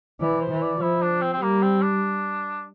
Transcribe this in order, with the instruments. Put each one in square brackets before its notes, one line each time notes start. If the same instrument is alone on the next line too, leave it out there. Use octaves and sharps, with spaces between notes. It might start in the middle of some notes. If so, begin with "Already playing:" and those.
[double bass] E3 [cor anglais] D5
[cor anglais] C5
[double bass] E3
[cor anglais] D5
[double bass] F3 [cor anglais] E4
[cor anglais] D4
C4
C4
[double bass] G3 [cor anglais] A#3
[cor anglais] C4
D4